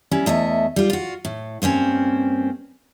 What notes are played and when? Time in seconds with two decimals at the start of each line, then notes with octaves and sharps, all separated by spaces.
0.11 G3 C#4 E4
0.26 E2 A3 D#5 E5
0.76 G3 F4
0.90 F4 F#4
1.25 A2
1.62 G2 A#3 C4 C#4